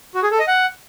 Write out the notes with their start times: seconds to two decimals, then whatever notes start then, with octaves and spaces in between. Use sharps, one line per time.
0.15 F#4
0.23 G#4
0.31 A4
0.39 D#5
0.47 F#5